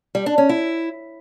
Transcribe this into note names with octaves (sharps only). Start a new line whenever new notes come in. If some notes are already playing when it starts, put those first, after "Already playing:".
G3
D4
C#4
E4